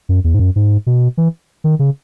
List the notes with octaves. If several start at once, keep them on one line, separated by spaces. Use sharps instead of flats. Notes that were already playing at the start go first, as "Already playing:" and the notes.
F#2
E2
G#2
F#2
G#2
B2
E3
D#3
C#3